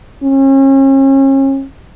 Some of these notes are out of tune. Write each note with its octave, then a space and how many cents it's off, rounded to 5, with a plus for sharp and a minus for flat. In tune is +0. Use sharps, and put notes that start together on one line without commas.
C#4 -35